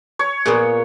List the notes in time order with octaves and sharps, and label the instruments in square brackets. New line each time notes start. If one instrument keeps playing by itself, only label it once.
[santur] C#5
[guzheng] A#2 A#3 B3 [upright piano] G#4